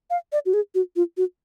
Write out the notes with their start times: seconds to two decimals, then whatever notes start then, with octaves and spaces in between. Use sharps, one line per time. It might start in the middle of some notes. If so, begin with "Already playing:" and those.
0.10 F5
0.32 D5
0.46 F#4
0.53 G#4
0.75 F#4
0.96 F4
1.17 F#4